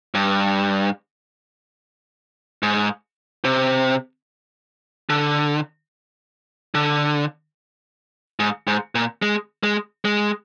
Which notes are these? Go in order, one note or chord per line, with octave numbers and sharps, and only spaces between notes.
G2
G#2
C3
D3
D3
G#2
G#2
A#2
G#3
G#3
G#3